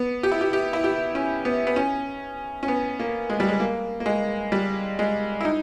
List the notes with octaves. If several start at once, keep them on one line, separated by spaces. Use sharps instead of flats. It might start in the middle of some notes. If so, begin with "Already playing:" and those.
Already playing: B3
G4
E4
G4
G4
E4
G4
C#4
B3
B3
C#4
C#4
B3
A#3
G#3
G3
G#3
A#3
A#3
G#3
G3
G#3
E4
D#4